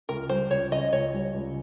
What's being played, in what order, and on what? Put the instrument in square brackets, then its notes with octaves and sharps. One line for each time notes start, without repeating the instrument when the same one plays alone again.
[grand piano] C#2 [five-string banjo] A#4
[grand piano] G3 [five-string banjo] C5
[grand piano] C#2 [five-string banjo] C#5
[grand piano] C#3 [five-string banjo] D#5
[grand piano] C#2 [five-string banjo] C#5
[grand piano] G3
C#2